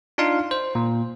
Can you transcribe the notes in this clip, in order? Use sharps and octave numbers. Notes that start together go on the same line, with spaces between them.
D4 D#4 F4 F5 C6
C5
A#2